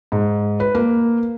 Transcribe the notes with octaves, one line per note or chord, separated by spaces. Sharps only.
G#2
B4
A#3